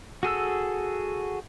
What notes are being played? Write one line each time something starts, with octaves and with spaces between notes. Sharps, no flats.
F#4 G#4 A4 E6